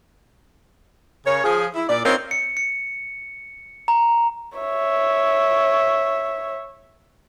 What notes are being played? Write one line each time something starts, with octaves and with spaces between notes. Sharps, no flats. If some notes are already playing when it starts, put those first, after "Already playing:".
C#3 A#4 C#5
F3 G#4
E4
A#2 D5
C4 D#4 F4 A#4 C#5
C#7
C#7
A#5
C#5 E5